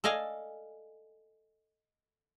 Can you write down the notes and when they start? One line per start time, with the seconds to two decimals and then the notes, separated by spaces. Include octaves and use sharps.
0.04 A4 D5 D#5 F5 G#5